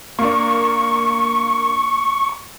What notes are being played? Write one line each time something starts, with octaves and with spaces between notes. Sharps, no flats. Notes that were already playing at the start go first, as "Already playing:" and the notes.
A#3 D4 C#6